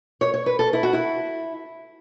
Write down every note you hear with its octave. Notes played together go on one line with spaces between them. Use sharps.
C#5
C#5
B4
A4
E4
F#4
E4